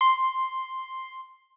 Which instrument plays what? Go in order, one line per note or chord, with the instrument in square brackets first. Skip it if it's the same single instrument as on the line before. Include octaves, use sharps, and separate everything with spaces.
[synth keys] C6